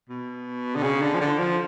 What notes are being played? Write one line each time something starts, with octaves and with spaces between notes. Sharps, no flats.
B2
D3
C#3
D3
F3
D3
F3